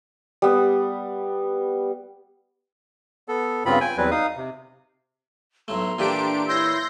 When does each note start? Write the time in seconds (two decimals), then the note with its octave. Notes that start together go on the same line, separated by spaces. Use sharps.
0.42 G3 B3
3.28 B3 A4
3.66 G2 C#3 B3 C4 F4 B5
3.81 G5 G#5
3.97 E2 F#3 G3 C4 B4
4.11 D#4 F5 D#6
4.37 C3
5.68 B1 A2 A3 A#5 C6
5.99 A#2 E3 D4 G4 A4 D7
6.48 E4 C#5 C6 E6 G6 A#6